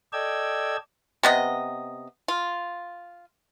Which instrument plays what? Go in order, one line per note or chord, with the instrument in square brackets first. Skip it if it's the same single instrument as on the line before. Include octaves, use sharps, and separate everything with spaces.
[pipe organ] A4 D5 D#5 G5 E6 G#6
[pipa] C3 B3 D#5
F4